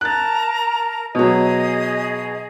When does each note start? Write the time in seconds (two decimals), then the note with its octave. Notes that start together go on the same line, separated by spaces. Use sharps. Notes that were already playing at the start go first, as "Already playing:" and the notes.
0.01 A#4 A5 A#5 F#6 A6
1.15 B2 F#3 G#4 D#5